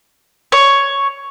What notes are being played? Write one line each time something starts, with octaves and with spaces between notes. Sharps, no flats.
C#5